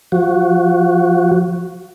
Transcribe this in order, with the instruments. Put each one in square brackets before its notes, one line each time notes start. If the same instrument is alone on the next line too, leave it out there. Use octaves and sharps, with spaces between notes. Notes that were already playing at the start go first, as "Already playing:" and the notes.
[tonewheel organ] F3 F#4